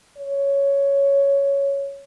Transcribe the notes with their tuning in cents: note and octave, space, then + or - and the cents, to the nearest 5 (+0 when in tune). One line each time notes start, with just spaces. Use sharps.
C#5 +5